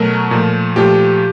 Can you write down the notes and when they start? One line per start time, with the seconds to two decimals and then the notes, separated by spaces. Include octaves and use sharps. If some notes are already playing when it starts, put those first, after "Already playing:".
Already playing: B2 F#3 A3 A#4
0.31 A#2 F3 A3
0.76 A#2 F3 A3 G4